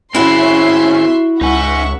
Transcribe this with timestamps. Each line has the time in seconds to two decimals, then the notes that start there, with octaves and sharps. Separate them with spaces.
0.15 C4 C#4 E4 F#4 G#4 E5 C6
1.41 C#2 D#4 E5 F#5 G#5 C#6